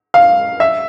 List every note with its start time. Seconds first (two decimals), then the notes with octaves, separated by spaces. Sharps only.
0.14 F5
0.60 E5